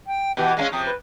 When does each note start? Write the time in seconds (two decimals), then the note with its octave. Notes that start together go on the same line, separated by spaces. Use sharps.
0.06 G5
0.37 B2 E3 G4
0.57 G#3 A3 C#4 F5
0.72 C3 F3 D#6
0.85 B4